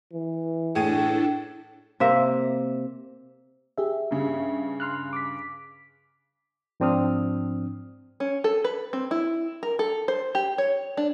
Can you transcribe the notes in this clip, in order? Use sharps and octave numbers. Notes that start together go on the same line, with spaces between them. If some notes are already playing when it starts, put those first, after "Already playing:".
E3
A2 D4 E4 G#4 A4 D#7
C3 A#3 E5
G4 G#4 E5
G2 C#3
C6 F6 F#6
D6 B6
G#2 F3 C4 D4 D#6 F6
C#4
A4
B4
C4
E4
A#4
A4
C5
G4
C#5
D4